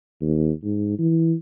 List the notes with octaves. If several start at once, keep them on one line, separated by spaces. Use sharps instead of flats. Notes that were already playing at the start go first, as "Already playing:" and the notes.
D#2
G#2
E3